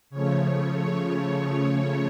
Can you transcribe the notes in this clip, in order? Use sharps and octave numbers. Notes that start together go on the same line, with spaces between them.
C#3 F3 A3 C#5
C#5